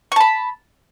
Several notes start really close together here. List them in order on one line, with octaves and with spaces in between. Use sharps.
C#6 A5 B5